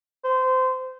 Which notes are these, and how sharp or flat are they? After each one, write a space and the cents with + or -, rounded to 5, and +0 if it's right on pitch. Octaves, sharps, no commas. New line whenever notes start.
C5 -25